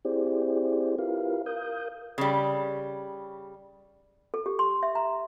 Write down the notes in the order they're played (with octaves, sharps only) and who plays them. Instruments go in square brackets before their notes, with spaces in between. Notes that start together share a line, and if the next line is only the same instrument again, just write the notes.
[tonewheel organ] C4 E4 G4 G#4 C5 D5
E4 F4 G4 A#4 B4 F5
A#4 F5 D#6 G6
[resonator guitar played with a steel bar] C#3 G3
[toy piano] A4
G4
C6
E5
A#5